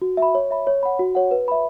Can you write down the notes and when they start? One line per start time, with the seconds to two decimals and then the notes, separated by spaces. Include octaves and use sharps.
0.02 F#4
0.17 E5
0.22 B5
0.35 C#5
0.51 E5 B5
0.67 C#5
0.83 F#5 B5
0.99 F#4
1.15 C#5 F#5
1.31 B4
1.48 E5 B5